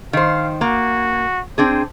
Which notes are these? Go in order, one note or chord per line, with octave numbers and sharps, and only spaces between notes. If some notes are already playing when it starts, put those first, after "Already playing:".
D#3 C5 F5
A#3 F#4
C4 D4 G#4 C5